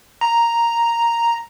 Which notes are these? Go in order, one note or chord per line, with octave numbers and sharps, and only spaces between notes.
A#5